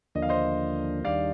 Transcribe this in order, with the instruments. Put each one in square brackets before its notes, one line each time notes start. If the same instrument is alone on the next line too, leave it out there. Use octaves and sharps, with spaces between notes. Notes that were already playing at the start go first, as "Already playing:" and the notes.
[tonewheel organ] D#2 D3 F3 A#3 D4 [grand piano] D#5
[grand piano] F5
C5 D#5
[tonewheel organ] D#2 D#3 G3 D4 [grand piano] D5 F5